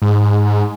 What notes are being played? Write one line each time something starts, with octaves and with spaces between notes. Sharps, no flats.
G#2